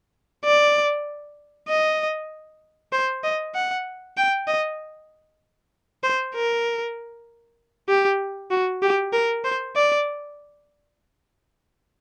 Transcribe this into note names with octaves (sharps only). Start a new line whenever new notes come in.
D5
D#5
C5
D#5
F#5
G5
D#5
C5
A#4
G4
F#4
G4
A#4
C5
D5